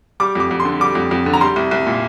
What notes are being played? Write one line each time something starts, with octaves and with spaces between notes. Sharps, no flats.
G3 D6
F2 D6
F2
C6
D3
G3 D6
F2
F2
D3
A#5
G3 C6
C2
C2
A#2